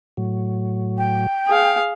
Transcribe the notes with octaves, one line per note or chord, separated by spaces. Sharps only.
A2 F#3
G5
G#4 F5